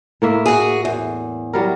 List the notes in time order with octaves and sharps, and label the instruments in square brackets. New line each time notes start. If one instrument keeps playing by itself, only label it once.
[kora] A2 A#3 E5
[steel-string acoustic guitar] F#4 G#4
E2
[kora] F#3 G3 A#4